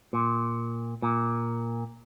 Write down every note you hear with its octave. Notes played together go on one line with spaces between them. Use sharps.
A#2
A#2